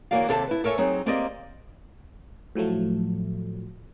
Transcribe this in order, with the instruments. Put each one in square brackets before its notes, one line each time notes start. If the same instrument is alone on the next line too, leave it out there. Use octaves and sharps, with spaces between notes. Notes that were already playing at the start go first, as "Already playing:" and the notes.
[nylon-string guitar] C#3 E3 A#3 F#4 D5 F5
D#2 C3 A4 A#4 E5 A5
E4 B4
A4 A#4 C#5 E5 G#5
F#3 C4 D#4 G#4
A#3 C4 G4 A#4 D5 D#5
[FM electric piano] A2 F3 F#3 A3